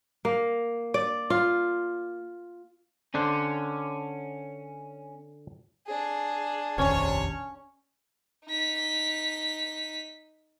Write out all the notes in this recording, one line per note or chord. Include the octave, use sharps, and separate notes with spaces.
A#3
D5
F4
D3 C#4 D4 C5
D4 G#4
F1 A#1 D#2 C3 C#4 C#5
D#4 B6